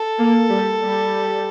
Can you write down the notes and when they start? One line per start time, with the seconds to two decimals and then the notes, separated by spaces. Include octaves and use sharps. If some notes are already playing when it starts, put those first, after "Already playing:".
Already playing: A4
0.18 A#3
0.49 G3
0.81 G3